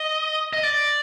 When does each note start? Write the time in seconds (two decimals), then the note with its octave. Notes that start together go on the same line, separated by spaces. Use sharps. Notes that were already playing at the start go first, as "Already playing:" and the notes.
Already playing: D#5
0.53 D#5
0.63 D5